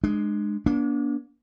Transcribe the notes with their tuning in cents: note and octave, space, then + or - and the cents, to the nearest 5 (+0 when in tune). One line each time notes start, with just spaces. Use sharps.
G#3 +10 D4 +40
A#3 +45 D4 -30